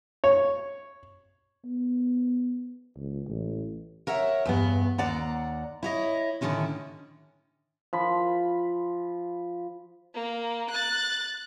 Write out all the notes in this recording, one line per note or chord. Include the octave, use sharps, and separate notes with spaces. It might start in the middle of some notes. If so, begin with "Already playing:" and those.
C#5
B3
C#2
A1
A#4 C#5 E5 F#5
E2 G2 B3
D#2 D5 F#5 A#5
E4 C#5 D#5
A2 D3 D#3 A#3 C#4 E4
F3 B5
A#3
F#6 A6